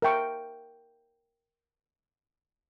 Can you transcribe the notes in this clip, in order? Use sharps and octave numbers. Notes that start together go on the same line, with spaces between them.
A#4 E5 G5 C#6